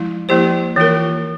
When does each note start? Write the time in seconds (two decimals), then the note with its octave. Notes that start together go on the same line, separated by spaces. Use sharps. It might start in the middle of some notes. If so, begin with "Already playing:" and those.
Already playing: F3 G#3 E4
0.29 F3 A#3 E4 G4 C5
0.76 E3 A#3 F4 A#4